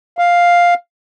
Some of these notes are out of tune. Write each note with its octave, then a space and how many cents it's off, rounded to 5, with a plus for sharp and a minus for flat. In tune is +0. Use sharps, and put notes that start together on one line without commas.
F5 +5